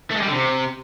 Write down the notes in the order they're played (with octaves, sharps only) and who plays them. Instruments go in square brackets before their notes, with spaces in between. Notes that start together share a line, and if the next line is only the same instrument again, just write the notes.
[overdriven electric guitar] A3
G#3
G3
D3
C3